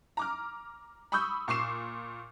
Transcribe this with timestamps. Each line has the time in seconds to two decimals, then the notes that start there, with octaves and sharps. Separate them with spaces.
0.17 A#5 D6 F6
1.12 B5 C#6 D#6 E6 G6
1.48 A#2 C#6 D6 C7 E7